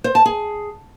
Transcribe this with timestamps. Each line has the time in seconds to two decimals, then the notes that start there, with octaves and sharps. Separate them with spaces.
0.04 C5
0.15 A5
0.26 G#4